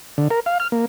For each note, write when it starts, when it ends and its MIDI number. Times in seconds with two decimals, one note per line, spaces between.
0.18 0.28 50
0.31 0.40 70
0.46 0.58 77
0.60 0.68 89
0.72 0.85 58